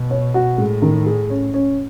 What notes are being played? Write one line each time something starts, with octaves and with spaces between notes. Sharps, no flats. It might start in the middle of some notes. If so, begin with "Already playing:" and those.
Already playing: B2
C#5
F#4
A2 G#3
D#3
G#4
C#4
C#4